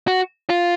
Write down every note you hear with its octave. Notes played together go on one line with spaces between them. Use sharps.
F#4
F4